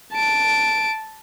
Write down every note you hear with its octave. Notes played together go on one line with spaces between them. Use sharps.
A5 D7